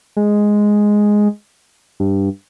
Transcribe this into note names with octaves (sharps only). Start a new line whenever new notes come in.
G#3
G2